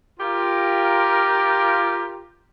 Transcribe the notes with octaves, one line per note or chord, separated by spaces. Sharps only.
F4 G4 A#4